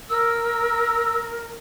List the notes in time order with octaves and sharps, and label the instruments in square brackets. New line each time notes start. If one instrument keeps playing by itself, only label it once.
[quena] A#4 [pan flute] E6